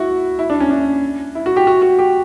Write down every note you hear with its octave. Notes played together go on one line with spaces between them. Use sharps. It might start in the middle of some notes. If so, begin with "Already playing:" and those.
Already playing: E4 F#4
E4
D4
C#4
D4
E4
F#4
G4
F#4
F#4
G4